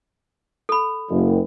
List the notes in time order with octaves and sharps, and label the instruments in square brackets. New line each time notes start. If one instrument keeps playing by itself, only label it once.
[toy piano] A4 B5
[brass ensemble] F#1